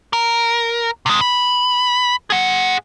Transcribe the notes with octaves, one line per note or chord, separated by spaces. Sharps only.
A#4
C3 G#3
B5
G#4 F#5